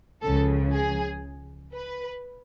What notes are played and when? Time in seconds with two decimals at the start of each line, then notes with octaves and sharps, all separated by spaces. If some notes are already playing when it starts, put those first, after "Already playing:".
0.22 C#2 C#3 F3 A4
0.73 G#4
1.75 B4